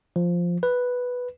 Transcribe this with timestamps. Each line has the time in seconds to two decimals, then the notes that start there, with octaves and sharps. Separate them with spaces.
0.16 F3
0.63 B4